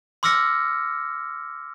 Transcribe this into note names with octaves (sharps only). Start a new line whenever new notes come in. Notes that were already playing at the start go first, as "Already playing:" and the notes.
C6 D6 E6 F6 A#6 C#7